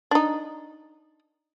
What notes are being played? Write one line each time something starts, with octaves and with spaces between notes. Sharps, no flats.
D4 D#4